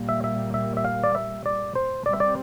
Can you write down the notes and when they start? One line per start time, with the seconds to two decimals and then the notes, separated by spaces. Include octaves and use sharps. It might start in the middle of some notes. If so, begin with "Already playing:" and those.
Already playing: A#2 G3 A#3
0.09 E5
0.24 E5
0.54 E5
0.77 E5
0.85 F5
1.04 D5
1.15 E5
1.46 D5
1.75 C5
2.06 C3 G3 C4 D5
2.13 E5
2.20 D5